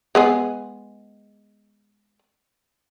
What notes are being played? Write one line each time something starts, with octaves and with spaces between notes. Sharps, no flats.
G#3 B3 G#4